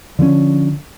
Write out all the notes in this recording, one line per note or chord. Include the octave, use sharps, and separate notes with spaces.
D3 F3 G3 C#4